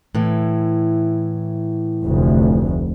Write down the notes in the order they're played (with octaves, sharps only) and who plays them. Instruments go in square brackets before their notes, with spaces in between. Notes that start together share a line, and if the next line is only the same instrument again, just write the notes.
[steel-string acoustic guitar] A2 E3
[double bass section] F1 D2